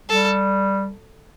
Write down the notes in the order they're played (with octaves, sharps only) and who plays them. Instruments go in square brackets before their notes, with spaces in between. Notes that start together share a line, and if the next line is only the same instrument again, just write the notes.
[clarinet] G3 [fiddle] A4